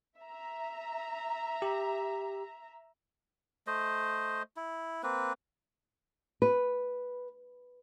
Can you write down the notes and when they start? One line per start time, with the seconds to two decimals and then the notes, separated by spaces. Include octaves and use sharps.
0.19 E5 A#5
1.62 G4
3.67 A3 C5 D#5
4.56 E4
5.03 A#3 C4 B4
6.42 B4